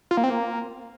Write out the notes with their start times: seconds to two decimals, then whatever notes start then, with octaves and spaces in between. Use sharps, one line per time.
0.11 F4
0.17 A#3
0.24 C4
0.30 A#3